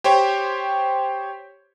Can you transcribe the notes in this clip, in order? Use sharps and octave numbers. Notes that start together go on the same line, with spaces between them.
G4 C5 C#5 G5